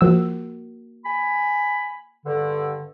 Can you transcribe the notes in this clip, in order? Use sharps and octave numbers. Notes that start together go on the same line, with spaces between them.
F3 A#3 F#4 A#4 E6
G#5 B5
G2 D3